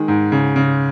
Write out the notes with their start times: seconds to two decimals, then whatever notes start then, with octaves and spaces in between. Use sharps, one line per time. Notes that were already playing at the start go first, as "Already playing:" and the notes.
Already playing: D#3 G#3
0.08 G#2
0.32 C#3
0.56 C#3